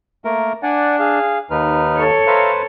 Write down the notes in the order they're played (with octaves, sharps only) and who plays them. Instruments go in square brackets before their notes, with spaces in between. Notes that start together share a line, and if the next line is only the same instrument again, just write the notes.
[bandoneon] A3 A#3 A#4
[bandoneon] D4 [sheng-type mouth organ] D5 F#5 G#5
[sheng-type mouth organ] G#4 F5
[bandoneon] D#2 [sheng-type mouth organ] D#4 B4 F6
[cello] A4 C#5
[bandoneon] B4 C5 [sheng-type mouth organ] E5 F5 A#5